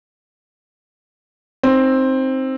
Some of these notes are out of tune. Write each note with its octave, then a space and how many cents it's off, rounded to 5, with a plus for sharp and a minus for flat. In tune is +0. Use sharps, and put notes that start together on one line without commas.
C4 +10 D#4 +0